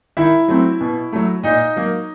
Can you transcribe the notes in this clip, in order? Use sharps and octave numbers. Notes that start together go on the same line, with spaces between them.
D#3 E4 E5
F#3 A3 C4
B2
F#3 A3
A#2 D#4 D#5
F#3 A#3